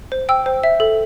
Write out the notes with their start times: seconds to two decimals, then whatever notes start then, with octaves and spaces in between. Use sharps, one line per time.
0.12 C5
0.29 G5 E6
0.46 C5
0.63 E5
0.80 A4